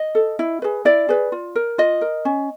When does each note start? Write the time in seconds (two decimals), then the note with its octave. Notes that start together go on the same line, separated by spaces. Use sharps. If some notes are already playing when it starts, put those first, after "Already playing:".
Already playing: D#5
0.15 A4
0.39 E4
0.62 G#4 B4
0.85 E4 D5
1.09 G#4 B4
1.32 F4
1.56 A#4
1.78 F4 D#5
2.01 A#4
2.25 C#4